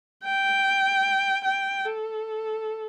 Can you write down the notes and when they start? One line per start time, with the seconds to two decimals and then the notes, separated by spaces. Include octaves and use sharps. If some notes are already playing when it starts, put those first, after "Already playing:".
0.24 G5
1.45 G5
1.85 A4